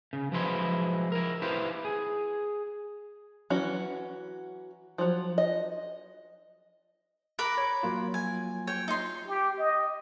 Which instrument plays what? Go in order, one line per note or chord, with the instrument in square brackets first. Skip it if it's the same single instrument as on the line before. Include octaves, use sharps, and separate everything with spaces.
[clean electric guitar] C#3
F3 F#3 G#3 E4 B4 C6
E4 A#4
E4 G4 B4 C5 E5 F5
G#4
[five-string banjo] E3 F#3 C#4 F#4
F3 F#3
D#5
[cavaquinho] A#4 B5 D6 [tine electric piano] F#6
[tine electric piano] C#5
F#3 A#3 F4
[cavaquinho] G#5
C#5 G5
D#4 C6
[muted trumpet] G4
D#5